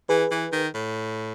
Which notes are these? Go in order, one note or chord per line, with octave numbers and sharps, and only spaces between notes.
E3 G#4 B4
E3
D#3
A2